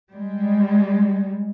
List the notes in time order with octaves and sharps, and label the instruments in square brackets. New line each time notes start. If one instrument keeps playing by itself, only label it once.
[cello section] G3 G#3